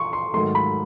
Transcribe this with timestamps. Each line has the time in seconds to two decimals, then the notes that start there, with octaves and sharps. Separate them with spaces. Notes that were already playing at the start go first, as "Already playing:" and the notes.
Already playing: C6 C#6
0.13 C6
0.34 G#2 D#3 F#3 A3 C6
0.55 B5